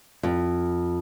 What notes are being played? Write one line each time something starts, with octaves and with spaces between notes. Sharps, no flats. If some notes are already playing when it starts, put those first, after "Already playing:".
F2